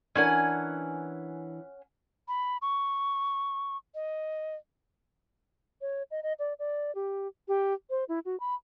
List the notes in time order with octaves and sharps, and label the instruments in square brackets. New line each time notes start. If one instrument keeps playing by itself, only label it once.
[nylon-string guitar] E3 D4 A#4 [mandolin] C#4 F#5 G#5
[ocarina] B5
C#6
D#5
[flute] C#5
D#5
D#5
D5
D5
G4
G4
C5
E4
F#4
B5